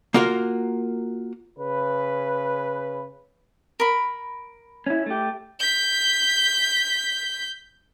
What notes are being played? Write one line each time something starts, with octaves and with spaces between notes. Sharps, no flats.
A#3 F4 F#4 A#4 F5
C#3 B4
A#4 B5
C#4 E4
A3 G4
G6 B6